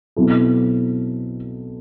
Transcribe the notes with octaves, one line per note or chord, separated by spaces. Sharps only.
B2 F#3 C4 E4 A4